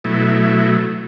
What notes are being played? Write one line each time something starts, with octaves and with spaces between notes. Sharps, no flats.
B2 F#3 A3 E4